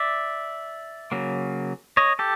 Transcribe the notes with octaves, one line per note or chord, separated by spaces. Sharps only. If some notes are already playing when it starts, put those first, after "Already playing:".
Already playing: D5 E5
C#3 F#3 A#3
C#5 D#5
G4 A4